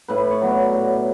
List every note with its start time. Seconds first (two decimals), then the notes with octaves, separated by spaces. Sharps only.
0.08 A2 B4
0.25 D5
0.31 C#5
0.41 F#3 B3
0.51 D5
0.72 A2